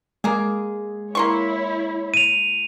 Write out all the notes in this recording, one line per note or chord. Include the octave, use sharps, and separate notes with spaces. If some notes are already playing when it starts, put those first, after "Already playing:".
G#3 A#3 G#4
A#3 E4 C#5 C6 C#6
D#7 F7